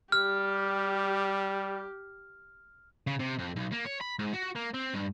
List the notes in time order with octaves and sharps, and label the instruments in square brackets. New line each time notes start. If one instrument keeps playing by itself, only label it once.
[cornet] G3 [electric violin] G4 [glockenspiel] F6
[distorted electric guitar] C#3
C3
F2
B1
A#3
C#5
B5
G#2
F#4
A#3
C4
G2